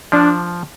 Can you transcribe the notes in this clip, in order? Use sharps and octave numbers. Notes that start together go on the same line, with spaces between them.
F3 D4